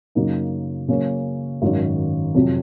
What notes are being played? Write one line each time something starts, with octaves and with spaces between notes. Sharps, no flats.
F#2 C#3 F#3 A#3 D#4
C#3 F#3 A#3 C#4
G#1 F#2 D#3 F#3
F2 C3 F#3